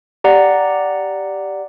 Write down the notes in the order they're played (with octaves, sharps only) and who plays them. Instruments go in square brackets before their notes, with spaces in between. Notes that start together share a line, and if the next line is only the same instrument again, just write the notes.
[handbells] G4 D5 F#5 A#5